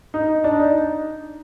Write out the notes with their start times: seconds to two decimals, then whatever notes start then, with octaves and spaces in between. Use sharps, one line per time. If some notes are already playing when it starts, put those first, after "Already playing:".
0.14 D#4
0.44 D4
0.60 D#4